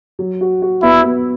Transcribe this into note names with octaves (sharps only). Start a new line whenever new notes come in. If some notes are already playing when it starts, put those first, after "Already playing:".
F#3
F#4
F#4
B3 E4
B3